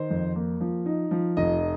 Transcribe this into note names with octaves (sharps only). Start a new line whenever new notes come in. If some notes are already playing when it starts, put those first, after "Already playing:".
Already playing: D#3 C5
F2
A#3
F3
D#4
F3
F1 D#5